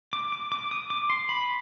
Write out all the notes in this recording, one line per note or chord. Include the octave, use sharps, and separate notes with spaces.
D6
D6
D6
D#6
D6
C6
B5